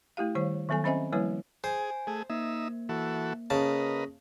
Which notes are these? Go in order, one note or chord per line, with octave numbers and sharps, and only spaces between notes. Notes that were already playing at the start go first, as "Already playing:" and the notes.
A3 E4 G4 F5
D#3 G3 C5 C#5
D#3 F#3 B3 A4 G#5
C4 C#4 C5 D#5 E5 G#5
F3 G3 A#3 E4 B4 C#5
G#4 C5 G#5
A3 G#4
A#3 D#4 E5
E3 F#4 A4
C#3 A#4 B4 D#5 A5